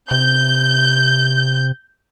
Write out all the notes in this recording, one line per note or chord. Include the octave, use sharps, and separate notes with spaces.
C3 G6